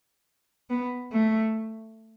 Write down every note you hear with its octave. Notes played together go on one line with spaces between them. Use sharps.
B3
A3